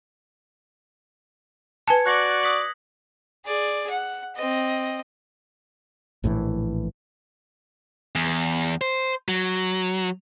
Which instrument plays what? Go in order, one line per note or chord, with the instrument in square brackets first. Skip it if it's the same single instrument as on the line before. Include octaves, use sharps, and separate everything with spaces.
[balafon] B4 G#5 A5 [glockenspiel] G#6 C#7
[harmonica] F#4 D5 [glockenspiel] F#6 A#6 F#7
[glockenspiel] D#6 B6 F#7
[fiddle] G#4 D5
F#5
C4 D#5
[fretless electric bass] A#1 A2 C3 E3
[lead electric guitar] E2
C5
F#3